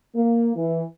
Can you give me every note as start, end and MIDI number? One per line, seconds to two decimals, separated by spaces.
0.15 0.52 58
0.55 0.82 52